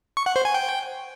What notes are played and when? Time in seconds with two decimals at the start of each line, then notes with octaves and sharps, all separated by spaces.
0.17 C#6
0.26 F#5
0.36 C5
0.45 G#5
0.54 G5